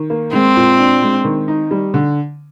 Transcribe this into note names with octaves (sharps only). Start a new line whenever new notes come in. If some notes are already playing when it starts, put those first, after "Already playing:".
Already playing: D#3
A#3
G#3 C4
A#2
D4
G#3
D#3
D#4
G3
D3